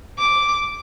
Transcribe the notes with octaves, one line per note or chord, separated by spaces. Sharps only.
D6